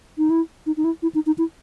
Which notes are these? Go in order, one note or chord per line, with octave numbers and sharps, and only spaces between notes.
D#4
E4
D#4
D#4
E4
E4
D#4
D#4
E4